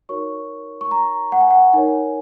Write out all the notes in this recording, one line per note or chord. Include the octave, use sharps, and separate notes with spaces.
D#4 F#4 A#4 C#5 C#6
C#6
A#5
F#5
G#5
F#5
D#4 A#4 C#5 G#5